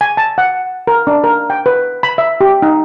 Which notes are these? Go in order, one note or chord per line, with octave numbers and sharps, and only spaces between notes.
G#5
A5
F#5
A#4
D4
A#4
G5
B4
B5
E5
G4
D#4